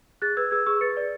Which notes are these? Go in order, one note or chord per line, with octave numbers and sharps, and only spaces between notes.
G#4 F#6 A6
B4 E6 G#6
G#4 E6 G#6
G#4 C#6 E6
B4 A6 C#7
D5